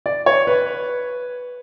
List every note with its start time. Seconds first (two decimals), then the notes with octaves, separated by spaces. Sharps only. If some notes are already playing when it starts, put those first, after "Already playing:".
0.06 D5
0.26 C#5
0.47 B4